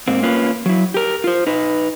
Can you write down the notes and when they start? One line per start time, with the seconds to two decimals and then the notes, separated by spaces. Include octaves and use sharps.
0.08 G#2 A#3 C4
0.23 A#3 C#4 F4 B4
0.66 F#3 E4
0.94 G4 A#4
1.24 F4 C5
1.47 D#4 B4